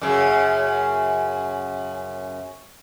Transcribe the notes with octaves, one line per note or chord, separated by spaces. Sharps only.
F#2 C#3